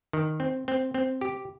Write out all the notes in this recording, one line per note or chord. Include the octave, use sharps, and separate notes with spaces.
D#3
C4
C4
C4
G4